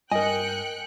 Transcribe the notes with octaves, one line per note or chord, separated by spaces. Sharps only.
G2 A#4 D#5 G5 G#5 F#6 C#7